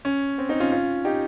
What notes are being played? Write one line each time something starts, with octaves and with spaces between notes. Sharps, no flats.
C#4
C4
C4 D#4
C#4 F4
C#4 F4
D#4 G4